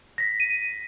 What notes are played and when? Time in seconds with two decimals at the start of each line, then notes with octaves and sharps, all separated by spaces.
0.18 A#6 B6
0.40 D#7